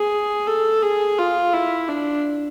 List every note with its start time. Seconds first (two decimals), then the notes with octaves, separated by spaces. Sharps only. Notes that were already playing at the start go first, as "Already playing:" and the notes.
Already playing: G#4
0.48 A4
0.82 G#4
1.18 F4
1.53 E4
1.89 D4